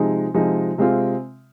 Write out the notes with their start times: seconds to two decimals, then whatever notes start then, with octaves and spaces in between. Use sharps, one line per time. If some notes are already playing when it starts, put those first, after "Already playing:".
Already playing: C3 F3 G#3 D#4
0.34 C3 F3 G#3 D#4
0.78 C3 G#3 C4 F4